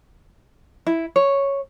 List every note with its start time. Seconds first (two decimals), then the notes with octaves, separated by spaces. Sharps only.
0.87 E4
1.16 C#5